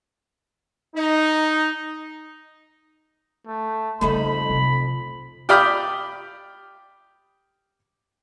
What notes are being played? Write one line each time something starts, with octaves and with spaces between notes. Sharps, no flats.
D#4
A3
F2 C#3 G3 A3 D#4 A4 B5
C3 F3
G4 D5 F5 G5 B5 D#6